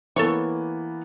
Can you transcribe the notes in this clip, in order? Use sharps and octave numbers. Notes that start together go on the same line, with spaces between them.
E3 A#3 B3 A4 C#5 C#6